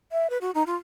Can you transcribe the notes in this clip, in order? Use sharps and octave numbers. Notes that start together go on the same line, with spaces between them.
E5
B4
F#4
D#4
F4